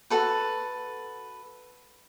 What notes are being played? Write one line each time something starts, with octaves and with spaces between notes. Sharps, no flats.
F#4 A4 B4